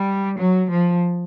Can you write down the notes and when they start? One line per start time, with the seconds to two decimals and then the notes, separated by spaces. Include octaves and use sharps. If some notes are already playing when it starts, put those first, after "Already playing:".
Already playing: G3
0.39 F#3
0.69 F3